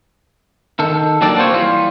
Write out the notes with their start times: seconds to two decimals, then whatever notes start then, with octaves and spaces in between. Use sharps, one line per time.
0.79 D#3 A4
1.21 F#3 A#3 D4 G4 A4 D5
1.36 A#3 C4 F4 C5 C#5
1.52 E3 G3 F4